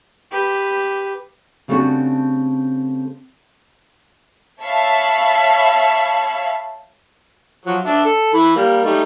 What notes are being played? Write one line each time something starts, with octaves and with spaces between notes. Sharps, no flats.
G4 B4
C#3 G3 A3 C4 D4 F#4
C#5 E5 F5 A5 B5
F3 F#3
D4 E5
A4
E3 B5
G3 A#3
G3 A3 D#4